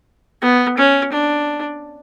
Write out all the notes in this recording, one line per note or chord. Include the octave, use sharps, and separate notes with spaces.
B3
C#4
D4